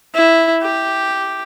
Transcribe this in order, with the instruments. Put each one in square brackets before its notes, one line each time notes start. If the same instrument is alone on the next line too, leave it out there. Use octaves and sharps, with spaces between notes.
[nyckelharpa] E4
G4